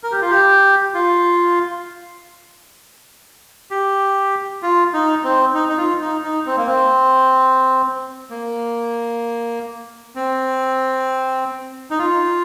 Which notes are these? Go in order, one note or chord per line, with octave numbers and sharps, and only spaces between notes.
A#4
G4
F4
G4
F4
G4
F4
D#4
C4
D#4
D#4
F4
D#4
D#4
C4
A#3
C4
A#3
C4
D#4
F4